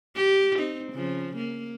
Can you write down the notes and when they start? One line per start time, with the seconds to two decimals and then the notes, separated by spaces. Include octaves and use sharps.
0.15 G4
0.57 C4 D#4
0.92 C#3 F3
1.36 A#3